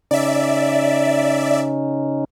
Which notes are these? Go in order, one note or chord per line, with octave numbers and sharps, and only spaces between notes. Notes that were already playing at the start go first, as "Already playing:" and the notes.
C#3 C#4 D#4 D5 E5